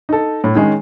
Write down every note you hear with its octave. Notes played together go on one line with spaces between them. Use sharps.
D#4 A4
A2
D#3 G#3 C#4